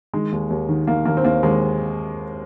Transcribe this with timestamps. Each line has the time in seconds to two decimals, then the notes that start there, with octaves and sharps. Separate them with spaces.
0.13 D#3 G#3
0.32 D#2
0.50 D#2
0.69 D#3
0.87 D#3 A#3
1.05 D#2 A#3
1.17 C4
1.25 D#2 A#3
1.43 D#2 G#3